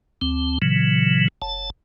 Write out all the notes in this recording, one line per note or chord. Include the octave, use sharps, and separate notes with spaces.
D2 C4
A#2 C#3 E3 F#3
F#1 A5